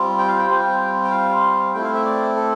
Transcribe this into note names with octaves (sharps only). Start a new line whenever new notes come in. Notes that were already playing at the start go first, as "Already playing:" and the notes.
Already playing: G3 C4 F4
G5
F5
G5
G3 C4 F4
G5
F5
A3 C4 E4 G5
F5
E5
D5
A4